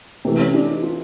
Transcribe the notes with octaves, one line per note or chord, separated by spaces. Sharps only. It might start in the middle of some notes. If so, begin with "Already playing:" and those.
C3 E3 A3
C#4
D4
D#4
F4